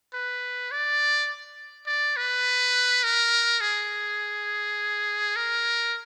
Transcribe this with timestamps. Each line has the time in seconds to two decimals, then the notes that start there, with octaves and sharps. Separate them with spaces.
0.14 B4
0.71 D5
1.87 D5
2.17 B4
3.04 A#4
3.61 G#4
5.36 A#4